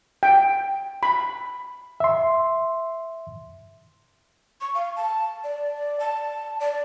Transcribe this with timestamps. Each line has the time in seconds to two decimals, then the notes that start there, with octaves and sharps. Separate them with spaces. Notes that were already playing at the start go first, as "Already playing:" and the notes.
0.23 G5
1.03 B5
2.00 E5 C6
4.61 C#6
4.75 F5
4.96 A5
5.44 D5
6.00 A5
6.60 D5